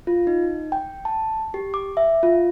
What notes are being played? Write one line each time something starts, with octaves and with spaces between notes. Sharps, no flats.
F4
D#4
G5
A5
G4
D6
E5
F4